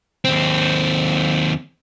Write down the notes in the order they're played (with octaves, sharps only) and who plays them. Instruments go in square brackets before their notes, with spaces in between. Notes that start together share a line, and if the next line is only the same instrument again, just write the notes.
[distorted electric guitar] D#2 C4